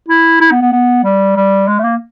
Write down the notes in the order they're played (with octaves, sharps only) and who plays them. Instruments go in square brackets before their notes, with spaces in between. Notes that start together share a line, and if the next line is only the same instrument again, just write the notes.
[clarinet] E4
E4
B3
B3
B3
G3
G3
G#3
A3
A#3